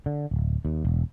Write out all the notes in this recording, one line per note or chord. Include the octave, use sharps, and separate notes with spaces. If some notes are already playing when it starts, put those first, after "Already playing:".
D3
D1
D#2
E1